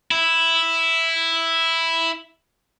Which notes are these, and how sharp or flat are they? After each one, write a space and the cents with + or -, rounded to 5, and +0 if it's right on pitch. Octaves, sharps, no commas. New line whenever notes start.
E4 +0